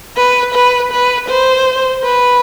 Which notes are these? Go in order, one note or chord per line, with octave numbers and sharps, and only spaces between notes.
B4
B4
B4
C5
B4